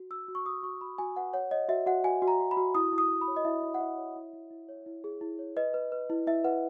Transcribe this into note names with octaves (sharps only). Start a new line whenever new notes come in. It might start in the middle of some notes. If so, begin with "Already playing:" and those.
Already playing: F#4
F#4 E6
F#4
C#6
F#4 D#6
F#4 C#6
F#4 B5
F#4 G#5
B4 F#5
C#5 F#5
C#5 D#5
F#4 E5
F#4 F#5
F#4 G#5
F#4
A#5
F#4
B5
F#4
E4 D#6
E4
D#6
E4
B5
C#5
D#5
E4 E5
E4
F#5
E4 E5
C#5
E4
E4
E4
C#5
E4
G#4
E4
C#5
B4 D#5
B4
B4
E4
E4 E5
B4 F#5